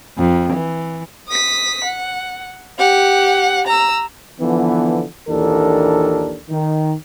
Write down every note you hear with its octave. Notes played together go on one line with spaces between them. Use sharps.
F2
E3
D#6 B6
F#5
G4 F#5
A#5 E6
D3 E3 F3 B3
A#1 D#2 E3 D4 A4 A#4
D#3